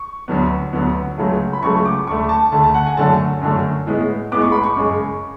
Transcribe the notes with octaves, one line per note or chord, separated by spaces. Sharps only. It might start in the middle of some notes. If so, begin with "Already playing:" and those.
Already playing: C#6
D2 D3 F#3 B3
D2 D3 F#3 B3
C#2 C#3 F#3 A3
B5
C#2 C#3 F#3 A3 C#6
D6
D2 D3 A3 C#6
A5
D2 D3 A3 A5
A5
F#5
G#5
F#2 D3 F#3 A3 A5
F#2 D3 F#3 A3
A2 G#3 B3
A2 G#3 B3 D6
C#6
B5
C#6
F#2 C#3 G#3